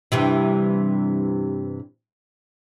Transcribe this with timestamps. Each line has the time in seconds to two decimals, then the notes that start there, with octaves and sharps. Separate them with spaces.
0.12 G2 C3 E3